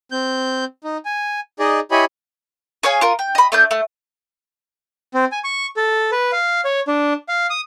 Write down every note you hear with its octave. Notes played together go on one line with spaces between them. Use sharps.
C4 G6
D#4
G#5
D#4 G#4 D5 D#5
E4 G4 C#5 D#5 G#5 B5
G#4 C#5 F5 G#5
F4 A#4
G5
D#5 B5
A3 D4 G6
A3
C4
G#5
C#6
A4
B4
F5
C#5
D4
F5
D#6